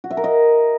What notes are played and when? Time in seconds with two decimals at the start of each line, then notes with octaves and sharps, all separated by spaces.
0.04 F#4
0.11 E5
0.17 A#4
0.24 D#5